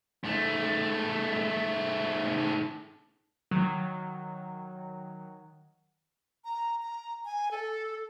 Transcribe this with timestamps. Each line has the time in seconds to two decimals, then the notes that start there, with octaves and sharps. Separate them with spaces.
0.24 G#2 A3
3.51 D#3 F#3
6.45 A#5
6.82 A#5
7.25 G#5
7.51 A4